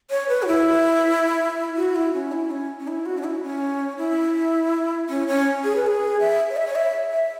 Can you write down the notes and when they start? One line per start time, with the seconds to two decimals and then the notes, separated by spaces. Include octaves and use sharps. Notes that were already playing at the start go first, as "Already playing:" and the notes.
0.10 C#5
0.29 B4
0.43 F#4
0.48 E4
1.77 F#4
1.95 E4
2.13 C#4
2.32 E4
2.51 C#4
2.80 C#4
2.88 E4
3.06 F#4
3.18 C#4
3.24 E4
3.43 C#4
3.98 E4
5.09 C#4
5.28 C#4
5.64 G#4
5.76 B4
5.87 G#4
6.20 E5
6.50 C#5
6.57 E5
6.67 C#5
6.75 E5
7.12 E5